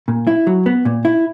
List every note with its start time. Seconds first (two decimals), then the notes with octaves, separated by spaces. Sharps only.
0.08 A#2
0.27 E4
0.47 F#3
0.66 B3
0.85 A#2
1.05 E4